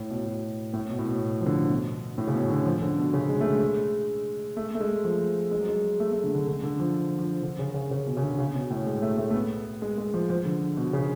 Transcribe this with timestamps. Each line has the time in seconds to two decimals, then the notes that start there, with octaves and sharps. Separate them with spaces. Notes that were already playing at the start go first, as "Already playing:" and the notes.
Already playing: A2
0.10 B2
0.26 B2
0.74 A2
0.90 B2
0.99 A2
1.06 B2
1.41 F3
1.46 D3
1.69 B2
2.18 A2
2.27 C#3
2.34 B2
2.50 D3
2.65 F3
2.81 D3
2.98 B2
3.13 C#3
3.29 G#3
3.41 A3
3.45 G#3
4.57 A3
4.75 A3
4.80 G#3
5.04 F3
5.51 G#3
5.60 F#3
5.69 G#3
6.00 A3
6.12 A3
6.24 D3
6.35 D3
6.47 D3
6.63 D3
6.79 F3
7.19 F3
7.43 D3
7.59 C#3
7.74 C#3
7.91 C#3
8.07 B2
8.17 C#3
8.22 D3
8.39 C#3
8.55 B2
8.70 A2
8.86 G#3
9.02 A3
9.18 A3
9.30 A3
9.34 B3
9.82 G#3
9.98 G#3
10.14 F3
10.30 F3
10.45 D3
10.77 B2
10.93 C#3